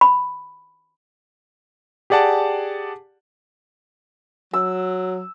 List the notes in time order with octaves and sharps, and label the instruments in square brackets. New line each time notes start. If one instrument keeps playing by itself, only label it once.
[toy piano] B5
[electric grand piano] G4 G#4 D5 F#5 A5
[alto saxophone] F#3 [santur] E6